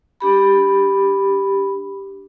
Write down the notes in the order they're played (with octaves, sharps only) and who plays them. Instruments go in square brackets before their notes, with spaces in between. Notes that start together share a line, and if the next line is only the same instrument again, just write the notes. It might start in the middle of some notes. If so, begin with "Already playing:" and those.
[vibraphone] D4 G4 B5